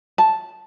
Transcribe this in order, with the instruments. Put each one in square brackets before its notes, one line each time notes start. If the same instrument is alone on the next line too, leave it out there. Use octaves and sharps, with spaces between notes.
[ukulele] A5